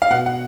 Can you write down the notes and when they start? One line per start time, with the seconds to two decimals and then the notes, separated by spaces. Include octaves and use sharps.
0.02 F5
0.10 B2 F#5
0.26 F#5